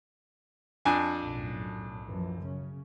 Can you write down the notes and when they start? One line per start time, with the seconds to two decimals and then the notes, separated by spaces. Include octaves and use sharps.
0.85 F2 D4 G#5
1.24 B1 F#2 A2
2.06 F#2 E3 F3
2.45 C#3 C#4